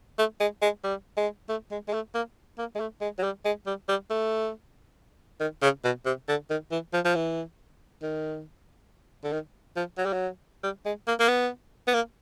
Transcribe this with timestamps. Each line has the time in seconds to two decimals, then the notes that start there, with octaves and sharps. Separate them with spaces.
0.18 A3
0.40 G#3
0.62 G#3
0.84 G3
1.17 G#3
1.49 A3
1.71 G#3
1.88 G#3
1.93 A3
2.15 A#3
2.58 A#3
2.75 G#3
2.80 A3
3.01 G#3
3.18 F#3
3.23 G3
3.45 G#3
3.67 G3
3.89 G3
4.10 A3
5.40 D#3
5.62 C#3
5.84 B2
6.06 C3
6.28 D3
6.50 D#3
6.71 E3
6.93 F3
7.05 F3
7.15 E3
8.02 D#3
9.24 D3
9.32 D#3
9.76 F3
9.98 F#3
10.05 G3
10.13 F#3
10.63 G3
10.85 G#3
11.07 A#3
11.19 A#3
11.28 B3
11.87 B3
11.94 A#3